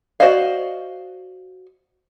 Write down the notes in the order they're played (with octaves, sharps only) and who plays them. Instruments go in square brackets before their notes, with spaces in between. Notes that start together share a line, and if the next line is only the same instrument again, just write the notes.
[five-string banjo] F#4 C5 D5 D#5 F5